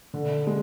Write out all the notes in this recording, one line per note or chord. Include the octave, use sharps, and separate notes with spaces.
D3
G#3